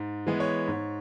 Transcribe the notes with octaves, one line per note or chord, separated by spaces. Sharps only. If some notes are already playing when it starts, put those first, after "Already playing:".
Already playing: G#2
E3 G#3 B3
C#5
G#2